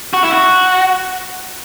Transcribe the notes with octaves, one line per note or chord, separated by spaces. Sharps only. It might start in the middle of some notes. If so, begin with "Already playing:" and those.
F#4
E4
F#4